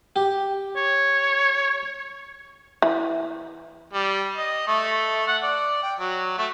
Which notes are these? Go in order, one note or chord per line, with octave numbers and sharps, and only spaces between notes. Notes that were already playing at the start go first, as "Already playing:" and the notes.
G4
C#5
E3
G3
D#5
A3
F#5
D5
G5
F#3
A3